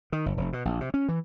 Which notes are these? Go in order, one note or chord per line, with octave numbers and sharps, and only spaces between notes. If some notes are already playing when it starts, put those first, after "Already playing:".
D#3
G1
F1
B2
A#1
C3
C#4
E3